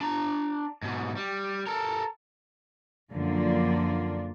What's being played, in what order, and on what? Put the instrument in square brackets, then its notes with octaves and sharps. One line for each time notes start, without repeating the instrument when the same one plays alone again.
[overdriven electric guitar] D4 A#5
G#2 B2
G3
A4 A#4
[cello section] F#2 D3 F3 A#3 D4 F4